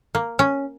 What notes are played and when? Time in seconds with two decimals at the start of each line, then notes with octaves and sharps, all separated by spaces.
0.15 A#3
0.39 C#4